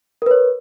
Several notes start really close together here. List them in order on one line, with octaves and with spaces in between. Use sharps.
A#4 B4 C#5